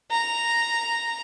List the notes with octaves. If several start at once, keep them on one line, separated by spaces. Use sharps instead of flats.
A#5